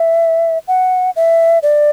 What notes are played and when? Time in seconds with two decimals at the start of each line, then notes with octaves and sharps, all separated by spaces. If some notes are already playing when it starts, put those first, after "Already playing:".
Already playing: E5
0.68 F#5
1.16 E5
1.63 D5